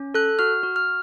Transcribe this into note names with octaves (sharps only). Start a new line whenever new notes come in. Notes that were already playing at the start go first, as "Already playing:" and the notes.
Already playing: C#4
A4 F#6
F#4 F6
F#4
F6